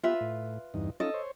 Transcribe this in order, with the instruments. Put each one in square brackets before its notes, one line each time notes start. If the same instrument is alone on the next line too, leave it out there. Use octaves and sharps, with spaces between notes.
[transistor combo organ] B3 G4 [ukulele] F4 B4 E5
[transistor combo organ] A2
E2 G2 D#4
[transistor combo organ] C#4 D#4 F4 [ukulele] A4 D#5
[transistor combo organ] C5 C#5